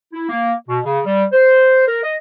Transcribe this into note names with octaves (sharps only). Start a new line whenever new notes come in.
E4
A#3
B2
C#3
G3
C5
A#4
D#5